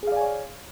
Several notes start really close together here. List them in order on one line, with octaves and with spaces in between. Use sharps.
G#4 F5 D5 G#5 C#5